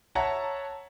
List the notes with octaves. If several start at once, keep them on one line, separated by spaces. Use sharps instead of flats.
C#5 E5 F#5 A5 A#5